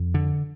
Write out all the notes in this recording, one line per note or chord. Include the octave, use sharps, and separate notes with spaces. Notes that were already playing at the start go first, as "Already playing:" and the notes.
Already playing: F2
D3